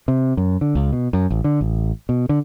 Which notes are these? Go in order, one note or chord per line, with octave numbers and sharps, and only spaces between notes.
C3
F#2
D3
C#2
B2
F#2
A1
D3
A1
B2
D3